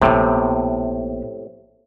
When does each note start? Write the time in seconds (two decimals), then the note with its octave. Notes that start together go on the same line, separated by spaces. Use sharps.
0.02 A#1 A2 C3 B3